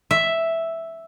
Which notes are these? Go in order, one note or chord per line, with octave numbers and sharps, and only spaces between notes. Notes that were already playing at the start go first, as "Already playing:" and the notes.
E5